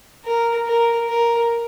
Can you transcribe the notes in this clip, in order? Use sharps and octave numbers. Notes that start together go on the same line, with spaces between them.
A#4
A#4
A#4